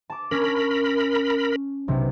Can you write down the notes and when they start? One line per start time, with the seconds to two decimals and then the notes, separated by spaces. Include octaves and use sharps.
0.10 A5 D6
0.31 C#4 A#4 B5
1.88 B1 C3